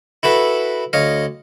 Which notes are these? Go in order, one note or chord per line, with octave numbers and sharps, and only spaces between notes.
E4 F#4 A4 B4
D2 C#5 D#5 F5